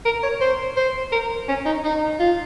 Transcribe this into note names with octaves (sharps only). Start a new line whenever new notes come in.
A#4
C#5
C5
C5
A#4
C#4
D#4
D#4
F4